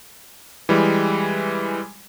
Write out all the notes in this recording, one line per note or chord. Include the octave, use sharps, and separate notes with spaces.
E3 G3 G#3